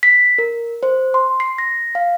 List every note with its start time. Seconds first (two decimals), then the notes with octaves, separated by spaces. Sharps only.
0.03 B6
0.38 A#4
0.83 C5
1.14 C6
1.40 C7
1.58 A#6
1.95 F5